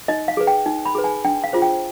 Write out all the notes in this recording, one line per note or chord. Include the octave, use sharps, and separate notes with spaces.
D#4 D#5
F5
G#4 B4
G5
D#4
B5
G#4 B4
G#5
D4 G5
F5
F4 G#4 C5
G5